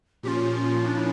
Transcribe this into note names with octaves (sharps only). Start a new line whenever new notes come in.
A#2 F3 C#4 F4 G4
D4
E4